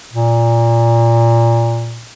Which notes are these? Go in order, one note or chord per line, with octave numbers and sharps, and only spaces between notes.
A#2